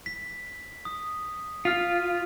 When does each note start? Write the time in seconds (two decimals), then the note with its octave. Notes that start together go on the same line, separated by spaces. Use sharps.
0.06 B6
0.85 D#6
1.65 F4 F6 B6